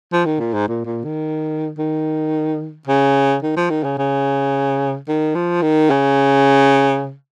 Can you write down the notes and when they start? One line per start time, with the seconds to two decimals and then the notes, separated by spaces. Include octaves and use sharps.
0.12 F3
0.25 D#3
0.40 A#2
0.54 G#2
0.68 A#2
0.85 A#2
1.04 D#3
1.78 D#3
2.87 C#3
3.43 D#3
3.56 F3
3.70 D#3
3.84 C#3
3.98 C#3
5.08 D#3
5.35 F3
5.62 D#3
5.90 C#3